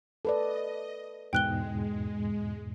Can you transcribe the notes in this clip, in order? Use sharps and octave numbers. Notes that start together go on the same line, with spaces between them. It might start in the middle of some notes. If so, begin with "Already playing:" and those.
A4 B4 D5 D#5
E2 G#2 B2 G#3 G5 F#6 G7